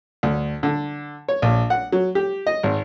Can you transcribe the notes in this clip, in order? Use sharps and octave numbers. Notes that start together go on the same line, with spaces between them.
D2
D3
C#5
A#1
F#5
F#3
G4
D#5
G#1